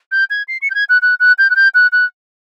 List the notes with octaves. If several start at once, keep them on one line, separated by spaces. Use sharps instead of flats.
G6
G#6
C7
C#7
G6
G#6
F#6
F#6
F#6
G6
F#6
G6
F#6
F#6